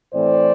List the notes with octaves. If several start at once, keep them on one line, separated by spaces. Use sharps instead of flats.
A2 E3 A3 C4 C5 D5